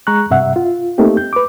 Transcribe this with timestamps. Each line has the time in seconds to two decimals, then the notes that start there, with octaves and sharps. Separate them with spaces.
0.07 G#3 A#5 C#6 F#6
0.31 G2 C3 E5 F#5
0.56 F4
0.98 A3 A#3 C4 D#4 G4
1.17 G6
1.33 B4 D6